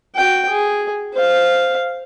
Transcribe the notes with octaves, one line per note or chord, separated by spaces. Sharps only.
F#4 G5
G#4
C5 F5